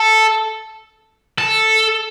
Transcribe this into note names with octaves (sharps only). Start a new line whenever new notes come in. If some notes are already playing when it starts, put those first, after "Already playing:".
Already playing: A4
A4